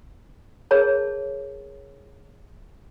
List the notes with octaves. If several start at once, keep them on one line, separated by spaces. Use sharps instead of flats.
G#4 A#4 C#5 A5